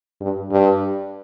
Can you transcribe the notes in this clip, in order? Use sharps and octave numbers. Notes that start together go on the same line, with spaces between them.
G2
G2